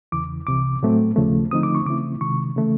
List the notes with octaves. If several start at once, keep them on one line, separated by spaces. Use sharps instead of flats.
E2 C#3 E3 D6
C2 C3 E3 D6
A2 F#3 A3 C4
D#2 C#3 F3 A3
D3 F3 A3 C4 D#4 D#6
D6
C#6
C#3 E3 A3 C4 E4 D6
C3 D#3 G#3 C#6
C#3 E3 A3